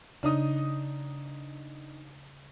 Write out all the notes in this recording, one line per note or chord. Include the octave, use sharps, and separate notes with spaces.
C#3 D4 D#4 D#6